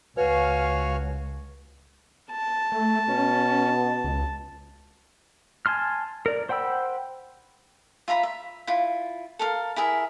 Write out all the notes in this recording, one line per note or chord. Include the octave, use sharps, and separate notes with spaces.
C#2 F#4 B4 C#5 F5 G#5 F6
A5
A3
B2 C#4
C#2
G#5 A5 C6 F6
A#4 D5
C5 F#5 G5 B5 E6
F4 E5 A#5 B5
E5
E4 F4
A4 A#4 F5
E4 G#4 A#4 E5